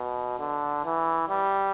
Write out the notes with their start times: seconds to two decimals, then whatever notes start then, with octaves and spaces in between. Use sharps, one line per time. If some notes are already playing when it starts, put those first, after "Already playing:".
Already playing: B2
0.40 D3
0.85 E3
1.29 G3